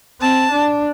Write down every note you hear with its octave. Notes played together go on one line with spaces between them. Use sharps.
C4 A5
D4